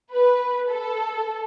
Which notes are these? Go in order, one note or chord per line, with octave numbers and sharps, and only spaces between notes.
B4
A4